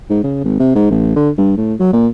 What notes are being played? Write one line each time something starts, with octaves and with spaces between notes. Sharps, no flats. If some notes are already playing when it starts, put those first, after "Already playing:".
G#2
C#3
G#1
C3
G#2
A1
D3
G2
A2
F#3
A#2